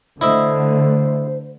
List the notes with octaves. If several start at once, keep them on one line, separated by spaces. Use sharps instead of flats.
D3 A3 E4 C5 D#5 E5